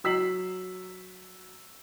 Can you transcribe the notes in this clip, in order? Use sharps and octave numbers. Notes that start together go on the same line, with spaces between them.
F#3 E6 B6 C7 F#7